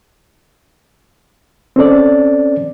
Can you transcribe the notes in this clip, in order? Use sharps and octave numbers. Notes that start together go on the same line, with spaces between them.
C4 C#4 A4 D5